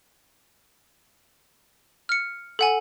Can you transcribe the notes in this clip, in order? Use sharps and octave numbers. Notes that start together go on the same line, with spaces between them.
F6 C#7
A4 F#5 G#5